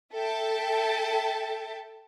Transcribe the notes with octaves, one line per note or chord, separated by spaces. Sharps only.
A4 E5 G5 A5